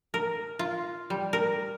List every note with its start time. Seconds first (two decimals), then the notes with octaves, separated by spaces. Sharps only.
0.14 A#4
0.59 F4
1.10 G3
1.33 A#4